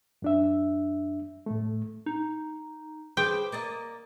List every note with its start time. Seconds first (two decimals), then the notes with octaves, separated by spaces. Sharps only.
0.22 F#2 D4 E5
1.46 A2 A3
2.06 D#4
3.17 G#4 B4 C5 G5 D6
3.52 A#3 D5 D#5